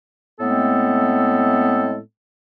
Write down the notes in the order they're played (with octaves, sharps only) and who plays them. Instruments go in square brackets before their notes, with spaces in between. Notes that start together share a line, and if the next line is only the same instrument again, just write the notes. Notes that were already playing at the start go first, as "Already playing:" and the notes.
[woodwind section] A2 G#3 A3 B3 C4 A4